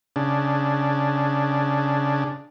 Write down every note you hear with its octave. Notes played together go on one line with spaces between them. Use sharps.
C#3 D4